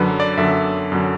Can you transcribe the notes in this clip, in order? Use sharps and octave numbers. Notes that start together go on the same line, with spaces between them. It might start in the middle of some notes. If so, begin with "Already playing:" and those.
Already playing: F#2 D3 F#3 B4
D5
F#2 D3 F#3 E5
F#2 D3 F#3